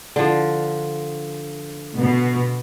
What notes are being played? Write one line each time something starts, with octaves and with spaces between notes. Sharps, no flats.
D3 F3
B2